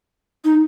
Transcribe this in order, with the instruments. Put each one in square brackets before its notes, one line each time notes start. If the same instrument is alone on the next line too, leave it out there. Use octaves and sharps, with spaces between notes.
[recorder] D#4